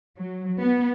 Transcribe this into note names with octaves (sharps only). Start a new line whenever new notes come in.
F#3
B3